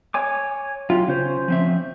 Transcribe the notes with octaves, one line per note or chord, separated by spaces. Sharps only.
C#5 G#5 D6
F#3 F4 G4
C#3 C#4 C5
F3 C4 E5